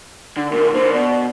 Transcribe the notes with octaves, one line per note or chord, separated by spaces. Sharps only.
D3
D2 A#2 A#4
D3 A#3 C5
B2 D5